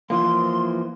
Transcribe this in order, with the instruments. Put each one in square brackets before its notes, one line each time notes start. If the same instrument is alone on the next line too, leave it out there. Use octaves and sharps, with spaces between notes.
[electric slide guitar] E3 F3 A#3 [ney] C6